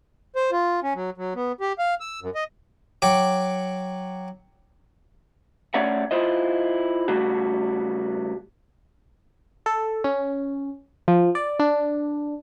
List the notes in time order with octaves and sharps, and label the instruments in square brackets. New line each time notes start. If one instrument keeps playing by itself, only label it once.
[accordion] C5
F4
C#4
F#3
F#3
B3
G4
F5
E6
F#2
D#5
[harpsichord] F#3 G5 D6
[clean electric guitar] A3 C#4 C#5 D5 E5 F#5
E4 F4 C5 D#5
C#3 G3 A3 F#4
[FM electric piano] A4
C#4
F3
D5
D4